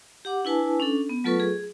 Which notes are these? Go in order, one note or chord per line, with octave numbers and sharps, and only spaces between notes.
G4 F#5 D6
D4 E4 B4 G#5 A5
C#4 D4 A4
B3
F#3 A3 F4 A4 B4 C#6
G#4